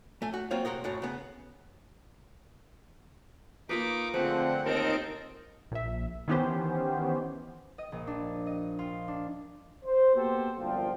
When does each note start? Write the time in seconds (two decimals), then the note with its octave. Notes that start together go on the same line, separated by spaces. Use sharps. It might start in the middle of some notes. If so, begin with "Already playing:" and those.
0.22 A3 G#5
0.34 F#4
0.51 F#3 A#3 C4 F4 C#5
0.65 C3 F#4 A#4 D#5
0.84 F#2 A2 F#3
1.02 C#3 B3
3.69 A#3 D#4 F4 B4 D6
4.14 D3 F3 A3 C4 G#4 F#5
4.65 D#2 C4 D#4 A4 A#4 D#5 D7
5.71 A#1 E5
6.28 D#3 E3 B3 C#4 G4 C5
7.78 D#5
7.92 A#1
8.07 D4
8.46 D#5
8.79 F4
9.08 D4
9.85 C5
10.15 A#3 B3 F#4 G4 A4 C5
10.58 G1 C2 F#2 F3 F4 G5